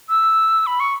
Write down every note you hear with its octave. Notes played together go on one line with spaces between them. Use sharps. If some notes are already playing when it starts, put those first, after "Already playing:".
E6
B5
C#6